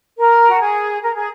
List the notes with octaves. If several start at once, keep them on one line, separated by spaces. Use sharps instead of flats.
A#4
F#4
G#4
A#4
G#4